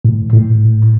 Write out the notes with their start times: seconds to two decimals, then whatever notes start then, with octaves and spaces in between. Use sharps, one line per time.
0.05 A2
0.33 A2